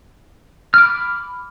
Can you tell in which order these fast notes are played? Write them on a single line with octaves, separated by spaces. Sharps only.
F6 D6 B5